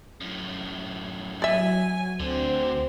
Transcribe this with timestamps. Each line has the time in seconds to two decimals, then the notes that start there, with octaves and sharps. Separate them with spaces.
0.21 F#2 A2
1.42 F#3 D5 E5 G#5
2.20 D2 D3 C4